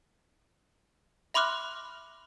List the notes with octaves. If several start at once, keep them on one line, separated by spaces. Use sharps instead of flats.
E5 B5 C6 D6 F6 F#6